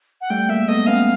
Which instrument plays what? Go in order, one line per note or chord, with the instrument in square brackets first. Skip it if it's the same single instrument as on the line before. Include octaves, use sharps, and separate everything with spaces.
[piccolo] F#5
[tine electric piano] G3 A3 [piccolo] G5
[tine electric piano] G#3 A#3 [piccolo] E5
[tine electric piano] A3 B3 [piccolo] D#5
[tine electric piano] B3 C#4 [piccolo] F5